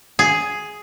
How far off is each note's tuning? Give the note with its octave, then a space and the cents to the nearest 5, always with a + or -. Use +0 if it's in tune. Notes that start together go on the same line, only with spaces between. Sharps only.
G#4 +5